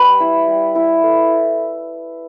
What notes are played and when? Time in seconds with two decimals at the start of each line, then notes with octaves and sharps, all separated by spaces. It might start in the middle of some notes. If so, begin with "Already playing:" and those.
Already playing: G3 B4 B5
0.20 E4
0.48 G3
0.75 E4
1.03 A3